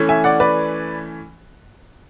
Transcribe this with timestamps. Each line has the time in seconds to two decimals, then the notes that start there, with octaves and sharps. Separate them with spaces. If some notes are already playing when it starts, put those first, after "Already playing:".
Already playing: E3 A3 C#4
0.09 E5 G#5
0.24 D5 F#5
0.40 B4 D5